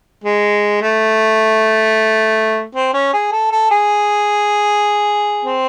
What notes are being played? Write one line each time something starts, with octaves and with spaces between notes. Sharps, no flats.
G#3
A3
C4
C#4
G#4
A4
A4
G#4
C4